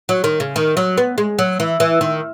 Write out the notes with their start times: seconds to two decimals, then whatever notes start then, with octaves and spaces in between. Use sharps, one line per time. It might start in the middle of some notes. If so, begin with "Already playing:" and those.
0.09 F#3
0.24 D#3
0.40 C#3
0.56 D#3
0.77 F#3
0.97 B3
1.18 G#3
1.39 F#3
1.60 E3
1.80 E3
2.01 D#3